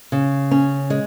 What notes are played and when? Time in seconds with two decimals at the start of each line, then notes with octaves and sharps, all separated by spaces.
0.12 C#3
0.51 C#4
0.90 G#3